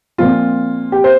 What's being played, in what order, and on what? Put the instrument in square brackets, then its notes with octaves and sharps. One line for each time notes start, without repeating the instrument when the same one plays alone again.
[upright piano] A#2 F3 C4 F4
G4
C5